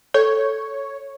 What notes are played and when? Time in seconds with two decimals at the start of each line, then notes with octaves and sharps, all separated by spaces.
0.14 A4 C#5